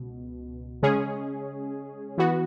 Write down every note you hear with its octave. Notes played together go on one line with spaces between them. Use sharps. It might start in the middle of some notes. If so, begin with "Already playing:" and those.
Already playing: C#2 B2
C#3 G#3 C#4 G#4
E3 B3 F#4